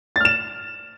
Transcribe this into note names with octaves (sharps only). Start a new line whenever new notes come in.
F6 A6 E7